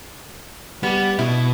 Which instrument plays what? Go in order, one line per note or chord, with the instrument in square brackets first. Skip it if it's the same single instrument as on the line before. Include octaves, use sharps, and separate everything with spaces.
[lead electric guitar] G3 G4 [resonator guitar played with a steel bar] B3
[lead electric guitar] B2 [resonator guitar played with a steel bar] E4